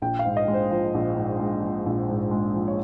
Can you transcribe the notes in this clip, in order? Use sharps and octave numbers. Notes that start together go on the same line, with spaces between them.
A#1 G5
F5
G#2
D#5
G#3
C5
F3 C5
A#1
G#2
G#3
F3
A#1
G#2
G#3
F3
C#5